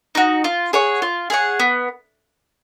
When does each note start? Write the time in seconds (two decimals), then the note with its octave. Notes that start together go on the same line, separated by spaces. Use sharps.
0.15 D#4 F#4
0.44 F4
0.73 G#4 C#5 F#5
1.02 F4
1.30 G#4 C#5 F#5
1.60 B3